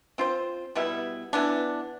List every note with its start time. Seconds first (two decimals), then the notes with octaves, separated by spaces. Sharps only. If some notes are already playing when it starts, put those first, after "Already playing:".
0.18 C4 F4 C5
0.75 B2 G3 B3 E4
1.33 E3 B3 D4